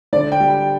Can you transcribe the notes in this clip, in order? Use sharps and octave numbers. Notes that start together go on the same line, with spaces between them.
D3 D5
G5
G3
G5